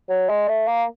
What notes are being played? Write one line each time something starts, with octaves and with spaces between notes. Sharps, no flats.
F#3
G#3
A3
A#3